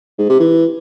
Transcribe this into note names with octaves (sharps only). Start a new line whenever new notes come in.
G#2
C3
E3